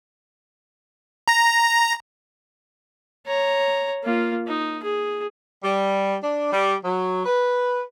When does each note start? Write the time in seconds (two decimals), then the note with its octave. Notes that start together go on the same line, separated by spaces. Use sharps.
1.28 A#5 A#6
3.26 C#5 A#5
4.04 A#3 F4
4.47 D#4
4.83 G#4
5.64 G3
6.22 D4
6.52 G3
6.83 F#3
7.25 B4